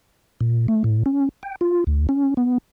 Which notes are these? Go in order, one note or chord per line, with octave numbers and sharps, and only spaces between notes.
A#2
A3
A2
C#4
G5
F4
D2
C#4
B3